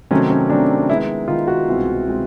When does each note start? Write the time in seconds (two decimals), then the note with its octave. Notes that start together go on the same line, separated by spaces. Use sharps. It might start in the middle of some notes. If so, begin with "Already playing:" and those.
0.11 C3 D#3 F#3 A3 C4 C#4
0.30 C#4
0.50 C3 D#3 F#3 A3 C4 D4
0.88 D#3 G#3 B3 E4
1.28 D#3 G#3 B3 F4
1.48 F#4
1.67 C2 B2 G#3 C4 E4
2.07 B2 G#3 C4 E4